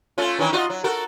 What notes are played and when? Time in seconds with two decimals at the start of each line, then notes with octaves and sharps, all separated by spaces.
0.18 A3 C#4 F4
0.39 D#3 E3 C#4
0.53 F4 F#4 D#5
0.70 F#3
0.84 F#4 A4 A#4